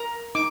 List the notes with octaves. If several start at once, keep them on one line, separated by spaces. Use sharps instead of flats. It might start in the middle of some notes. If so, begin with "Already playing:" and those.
Already playing: A#4 A#5
D#4 D6